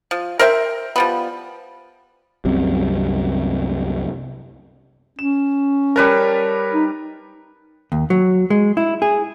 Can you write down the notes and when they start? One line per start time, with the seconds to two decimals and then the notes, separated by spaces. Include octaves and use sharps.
0.11 F3
0.39 A#4 C5 E5 G5
0.96 F3 G3 B3
2.45 C2 F#2 C3
5.19 C#4 E7
5.96 G3 A#4 B4 C#5 A5
6.74 D#4
7.92 D#2
8.10 F#3
8.50 G#3
8.77 E4
9.02 G#4